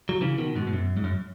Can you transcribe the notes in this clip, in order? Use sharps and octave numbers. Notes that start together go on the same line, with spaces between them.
F#3
C#3 E3
B2 D#3
G#2 B2
G#2
F#2
G#2
F#2